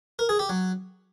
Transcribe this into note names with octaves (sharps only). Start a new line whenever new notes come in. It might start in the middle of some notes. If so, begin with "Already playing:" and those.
A#4
G#4
G4
F#3